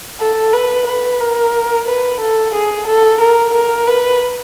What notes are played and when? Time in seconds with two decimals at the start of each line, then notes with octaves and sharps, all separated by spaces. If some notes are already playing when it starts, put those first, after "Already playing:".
0.20 A4
0.53 B4
0.87 B4
1.20 A#4
1.87 B4
2.20 A4
2.54 G#4
2.87 A4
3.21 A#4
3.54 A#4
3.87 B4